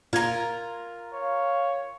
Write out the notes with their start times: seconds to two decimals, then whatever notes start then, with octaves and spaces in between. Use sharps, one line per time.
0.13 A#2 F4 A#4 G#6
1.13 C#5 F5